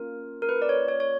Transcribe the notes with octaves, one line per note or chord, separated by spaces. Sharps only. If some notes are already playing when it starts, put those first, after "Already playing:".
Already playing: A#3 C#4 F4 A#4
A#4
B4
D5
C#5
C#5
C#5